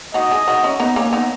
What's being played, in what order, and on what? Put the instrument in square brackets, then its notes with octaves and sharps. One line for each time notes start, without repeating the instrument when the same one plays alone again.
[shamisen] D#4 F#4 [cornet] D#5
[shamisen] E4 G#4
D#4 F#4
C#4 E4
B3 D#4
A#3 C#4
B3 D#4